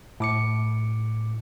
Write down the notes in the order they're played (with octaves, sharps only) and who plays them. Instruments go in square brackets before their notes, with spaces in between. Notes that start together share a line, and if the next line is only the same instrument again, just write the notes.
[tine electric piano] A2 D6 C#7